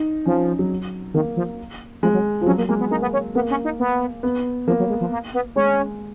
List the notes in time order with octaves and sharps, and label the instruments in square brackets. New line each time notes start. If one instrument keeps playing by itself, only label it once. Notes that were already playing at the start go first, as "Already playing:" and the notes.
Already playing: [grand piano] D#4
[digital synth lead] F3 [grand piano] C#4
[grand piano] F#3
[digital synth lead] D#3 [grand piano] A#3
[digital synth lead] F3
[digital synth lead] F3 [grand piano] G#3
[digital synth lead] F#3
[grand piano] F3
[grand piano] F#3 [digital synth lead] C#4
[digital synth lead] A#3
[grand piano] G#3 [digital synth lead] A#3
[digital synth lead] B3
[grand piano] A#3 [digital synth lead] D#4
[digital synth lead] B3
C#4
[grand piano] A#3 [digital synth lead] B3
[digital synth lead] C#4
D#4
B3
[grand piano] B3
[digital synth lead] F3 [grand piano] A#3
[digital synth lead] F#3
G#3
F3
A#3
B3
[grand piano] G#3 [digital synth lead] C#4